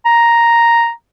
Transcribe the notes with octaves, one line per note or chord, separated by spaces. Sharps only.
A#5